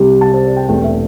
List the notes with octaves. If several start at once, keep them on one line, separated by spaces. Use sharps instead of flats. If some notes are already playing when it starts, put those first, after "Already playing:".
Already playing: C2 C3 G3
A5
C5
D5
G5
E1 E2 C3 A3 G5
E5